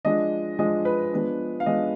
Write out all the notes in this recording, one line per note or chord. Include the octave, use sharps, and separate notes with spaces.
F3 G#3 D4 D#5
F3 G#3 D4 D#5
B4
F3 G#3 B3 D4
F5
F3 G#3 B3 D4 D#5